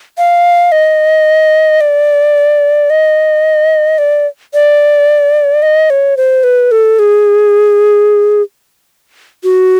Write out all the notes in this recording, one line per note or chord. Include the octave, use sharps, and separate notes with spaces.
F5
D#5
D5
D#5
D5
D5
D#5
C#5
C5
B4
A4
G#4
F#4